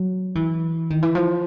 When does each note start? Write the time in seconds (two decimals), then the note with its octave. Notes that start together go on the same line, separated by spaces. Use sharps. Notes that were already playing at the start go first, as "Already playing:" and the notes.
Already playing: F#3
0.35 E3
0.90 D#3
1.02 E3
1.15 F3